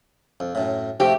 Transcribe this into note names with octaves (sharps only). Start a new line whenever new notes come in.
F2
F#2 A2
F2 C3 A3 G4